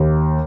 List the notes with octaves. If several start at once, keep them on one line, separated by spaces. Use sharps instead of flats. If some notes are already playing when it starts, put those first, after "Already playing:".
Already playing: D#2